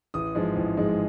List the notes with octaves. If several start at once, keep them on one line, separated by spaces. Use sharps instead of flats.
A1 D#6
G#2 F3 G#3
A1
G#2 F3 G#3